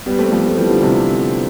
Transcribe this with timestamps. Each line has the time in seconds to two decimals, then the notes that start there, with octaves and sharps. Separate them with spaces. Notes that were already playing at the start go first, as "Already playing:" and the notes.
0.06 G3 B3
0.19 A3 C4
0.32 F3 A3
0.45 F3 A3
0.57 E3 G3
0.70 D3 F3
0.82 C3 E3